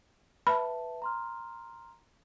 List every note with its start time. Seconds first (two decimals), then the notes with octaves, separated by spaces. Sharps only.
0.47 B4 E5 A5 B5
1.02 A#5 C6 F6